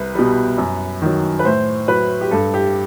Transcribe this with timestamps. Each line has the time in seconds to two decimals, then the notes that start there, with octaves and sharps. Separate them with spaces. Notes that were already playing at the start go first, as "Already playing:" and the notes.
Already playing: C2 B4
0.15 B2 G3
0.58 F#2
1.02 D#3 F#3
1.39 B4
1.44 A2 C5
1.88 F#3 B4
2.21 G4
2.31 G2 A4
2.54 G4